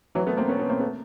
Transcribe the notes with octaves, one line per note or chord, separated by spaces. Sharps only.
E3 F#3
A3 B3
A#3 C4
B3 C#4
B3 C#4
A#3 C4
A3 B3